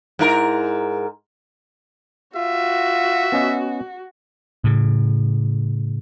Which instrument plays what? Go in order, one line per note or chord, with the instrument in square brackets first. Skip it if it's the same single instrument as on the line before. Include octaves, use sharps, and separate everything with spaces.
[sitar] G#2 E4 A#4
[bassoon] F4 [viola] F#4 [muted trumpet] E5
[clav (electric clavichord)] B3 C#4 D#5
[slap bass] A2 C#3